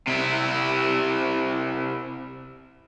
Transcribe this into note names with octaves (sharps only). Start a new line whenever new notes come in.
C3 E4